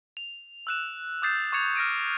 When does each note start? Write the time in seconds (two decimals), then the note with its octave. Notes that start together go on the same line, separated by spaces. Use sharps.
0.17 F7
0.67 E6 F#6 E7
1.22 D6 D#6 G6 A6 C7 E7
1.52 C#6 D6 G#6 C#7 F7
1.75 F6 A#6 D7 D#7